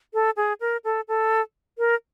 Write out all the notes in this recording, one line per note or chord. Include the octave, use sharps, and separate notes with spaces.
A4
G#4
A#4
A4
A4
A#4